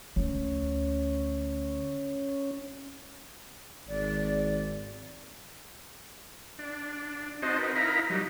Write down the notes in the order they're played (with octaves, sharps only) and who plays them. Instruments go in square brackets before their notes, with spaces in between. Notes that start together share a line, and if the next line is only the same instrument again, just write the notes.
[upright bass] D2 [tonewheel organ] C#4
[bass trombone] G#1 [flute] D5
[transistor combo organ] D4
C4 D#4 F#4 C5 D#5 A5
D#4 A#4 B4
D#4 E4 A#4 F5 A#5 B5
F#3 G3 D#4